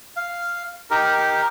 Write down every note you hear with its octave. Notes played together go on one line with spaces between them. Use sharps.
F5
D#4 G4 A#4